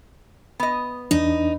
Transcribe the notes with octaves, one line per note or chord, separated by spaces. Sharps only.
B3 D#5
E2 D4 D#4